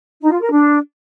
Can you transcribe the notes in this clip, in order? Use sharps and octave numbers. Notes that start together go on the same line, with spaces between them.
D#4
F4
A#4
D4